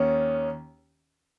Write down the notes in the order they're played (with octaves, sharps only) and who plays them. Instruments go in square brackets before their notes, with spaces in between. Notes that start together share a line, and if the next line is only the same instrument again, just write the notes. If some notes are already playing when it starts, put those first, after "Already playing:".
Already playing: [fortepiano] D#2 D#3 C#4